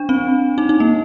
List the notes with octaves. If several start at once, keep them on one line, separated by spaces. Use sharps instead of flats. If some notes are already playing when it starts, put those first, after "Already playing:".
Already playing: D4
C4
D#4
D#4
A#3